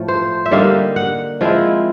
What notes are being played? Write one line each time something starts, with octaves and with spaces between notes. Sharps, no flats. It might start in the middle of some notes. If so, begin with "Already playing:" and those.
Already playing: A2 F3 A3
C5
E5
D3 G3 A#3 D#4 F5
F#5
F3 G#3 C4 E4